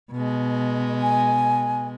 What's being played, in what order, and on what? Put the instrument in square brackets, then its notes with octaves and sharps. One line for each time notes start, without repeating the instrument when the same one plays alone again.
[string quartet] B2 G#3
[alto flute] G#5